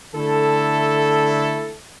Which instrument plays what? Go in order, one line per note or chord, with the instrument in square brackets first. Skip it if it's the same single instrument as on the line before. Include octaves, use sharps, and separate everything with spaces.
[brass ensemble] D3 A3 E4 A4